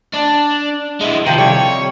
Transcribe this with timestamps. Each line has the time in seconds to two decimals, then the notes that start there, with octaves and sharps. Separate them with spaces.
0.14 D4
1.01 G#3 E4
1.26 C3 D#3 F3 C5
1.38 G3 E4 A4 C#5